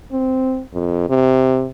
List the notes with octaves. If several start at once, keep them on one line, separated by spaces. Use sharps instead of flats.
C4
F2
C3